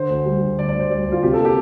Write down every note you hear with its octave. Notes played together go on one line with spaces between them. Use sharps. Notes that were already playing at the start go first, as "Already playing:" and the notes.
Already playing: D3 C5
D2
G3
D2
D3 D5
D5
D2
C5
G3 D5
D2
F4
C3 G4
A4
A#3 G4